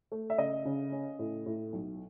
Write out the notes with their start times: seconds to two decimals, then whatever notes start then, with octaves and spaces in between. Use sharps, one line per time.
0.12 A3
0.30 E5
0.38 C#3 D#5
0.65 C#3
0.92 C#4
1.19 A2
1.46 A2
1.73 B1